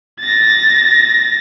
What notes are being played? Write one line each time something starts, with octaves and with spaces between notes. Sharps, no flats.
A6 A#6